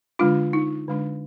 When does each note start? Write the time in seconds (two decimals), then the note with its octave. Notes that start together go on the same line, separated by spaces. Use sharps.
0.19 D3 G#3 D4 F4
0.53 D#4
0.88 D3 G#3 D4